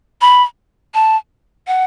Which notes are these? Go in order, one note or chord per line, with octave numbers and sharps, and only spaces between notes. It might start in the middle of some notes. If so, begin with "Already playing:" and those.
B5
A5
F#5